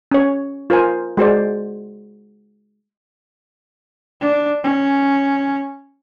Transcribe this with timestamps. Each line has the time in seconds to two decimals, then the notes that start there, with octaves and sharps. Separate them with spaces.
0.11 C#4 C#5
0.70 F4 A#4 C5 G#5
1.17 G#3 F#4 C5 D5
4.21 D4
4.64 C#4